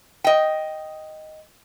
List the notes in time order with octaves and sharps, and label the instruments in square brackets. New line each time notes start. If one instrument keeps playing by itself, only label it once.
[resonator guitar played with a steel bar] D#5 G5